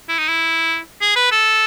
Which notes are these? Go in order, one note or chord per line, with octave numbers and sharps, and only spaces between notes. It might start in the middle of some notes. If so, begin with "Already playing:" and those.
E4
D#4
E4
G#4
B4
A4